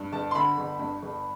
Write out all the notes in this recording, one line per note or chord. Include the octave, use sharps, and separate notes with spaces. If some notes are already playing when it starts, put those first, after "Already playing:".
Already playing: G2
G1 A5
C6
D3 B5
G1
G2
G1